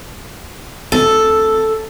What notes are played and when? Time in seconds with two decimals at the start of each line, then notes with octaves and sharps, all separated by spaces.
0.92 D2 B3 C4 A4